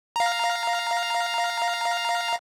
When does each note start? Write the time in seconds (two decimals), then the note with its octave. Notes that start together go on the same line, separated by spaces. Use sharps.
0.16 F5 A#5